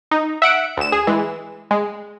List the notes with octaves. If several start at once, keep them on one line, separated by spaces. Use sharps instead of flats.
D#4
E5 F#5 D7
D2 E7
G#4
E3 G#3
G#3